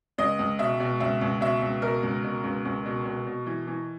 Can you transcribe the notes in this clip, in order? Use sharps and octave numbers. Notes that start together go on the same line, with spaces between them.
C#2 D#5
C#2
B2 E5
B2
C#2 E5
C#2
B2 E5
C#2
B2 A#4
C#2
B2
C#2
C#2
B2
B2
B2
E3
E3